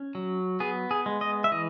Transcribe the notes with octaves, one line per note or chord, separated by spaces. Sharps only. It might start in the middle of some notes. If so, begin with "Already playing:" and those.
Already playing: C#4
F#3
B3 G#4
G#4
G#3
D#5
E5
E3 D#5